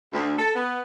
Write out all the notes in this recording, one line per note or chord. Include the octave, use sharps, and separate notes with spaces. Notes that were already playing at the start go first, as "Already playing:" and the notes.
D2
A4
B3